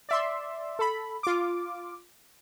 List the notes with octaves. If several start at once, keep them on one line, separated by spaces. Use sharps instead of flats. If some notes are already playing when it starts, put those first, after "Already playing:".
D5 E5 C6
A4 B5
F4 D6